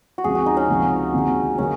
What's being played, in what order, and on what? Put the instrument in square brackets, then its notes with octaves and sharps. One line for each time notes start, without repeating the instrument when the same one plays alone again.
[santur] F#4
[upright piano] C#2 C#3 F3 C4 [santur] G#4
[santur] F#4
D#4
C#4
[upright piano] C#2 C3 F3
D#2 C#3 G#3 C4
[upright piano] C#3 F#3 A#3 [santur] C#4